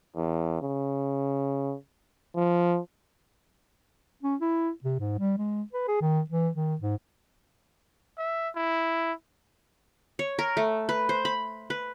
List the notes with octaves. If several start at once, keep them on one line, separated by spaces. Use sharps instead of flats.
E2
C#3
F3
C#4
E4
C3
G#2
G3
G#3
B4
G#4
D#3
E3
D#3
G#2
E5
E4
C#5
A#4
A3
B4
C5
B5
B4